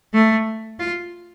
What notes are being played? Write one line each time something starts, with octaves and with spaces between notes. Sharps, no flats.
A3
F4